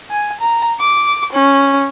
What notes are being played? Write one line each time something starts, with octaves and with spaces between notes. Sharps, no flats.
G#5
A#5
D6
C#4